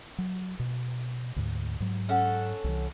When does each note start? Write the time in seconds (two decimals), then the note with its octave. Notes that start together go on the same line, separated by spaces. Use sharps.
0.18 F#3
0.59 B2
1.36 D2 G#2
1.80 G#2 F#3
2.09 C#4 A4 F#5
2.64 C2 E3